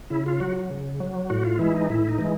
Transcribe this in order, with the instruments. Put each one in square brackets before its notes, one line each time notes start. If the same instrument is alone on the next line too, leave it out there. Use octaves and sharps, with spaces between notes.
[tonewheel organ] C#3 E4
F4
F#3 F#4
C#3
F#3
A2 F#4
F4
E3 G#3 E4
D#4
A2 E4
D#4
E3 G#3